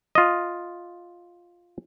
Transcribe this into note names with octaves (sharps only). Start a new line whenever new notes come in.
F4 D#5